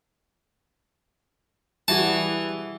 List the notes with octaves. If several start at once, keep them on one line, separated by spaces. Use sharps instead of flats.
E3 G3 F#4 G#4 A5